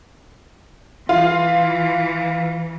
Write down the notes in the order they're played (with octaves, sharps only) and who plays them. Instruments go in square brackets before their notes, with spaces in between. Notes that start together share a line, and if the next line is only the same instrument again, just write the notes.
[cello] E3 [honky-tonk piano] F4